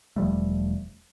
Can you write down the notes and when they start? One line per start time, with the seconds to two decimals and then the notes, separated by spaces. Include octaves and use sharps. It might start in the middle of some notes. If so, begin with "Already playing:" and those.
0.16 E1 F3 G3 A3